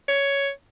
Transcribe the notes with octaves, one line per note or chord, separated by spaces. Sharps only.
C#5